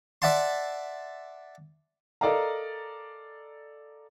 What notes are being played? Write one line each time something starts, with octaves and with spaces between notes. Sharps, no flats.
D5 E5 F#5 A5 C6
A4 A#4 D5 D#5 F5 A#5